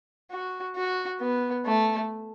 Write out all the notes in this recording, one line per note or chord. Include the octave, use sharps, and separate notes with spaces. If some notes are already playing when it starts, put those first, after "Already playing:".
F#4
F#4
B3
A3